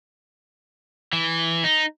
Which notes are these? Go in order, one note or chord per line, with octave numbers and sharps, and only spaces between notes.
E3
D#4